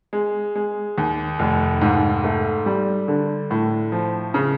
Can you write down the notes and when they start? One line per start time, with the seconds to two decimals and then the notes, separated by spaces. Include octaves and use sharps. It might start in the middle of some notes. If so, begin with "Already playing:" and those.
0.13 G#3
0.55 G#3
0.98 D#2
1.39 F1
1.81 G#2
2.24 A3
2.66 G3
3.08 D3
3.51 A2
3.92 F3
4.34 C#3